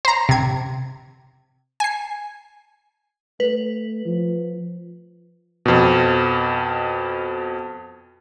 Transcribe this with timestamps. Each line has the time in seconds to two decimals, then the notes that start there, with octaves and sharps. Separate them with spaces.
0.05 C5 A#5
0.29 C3 G#6
1.80 G#5 C7
3.40 A3 B4
4.06 F3
5.66 F2 B2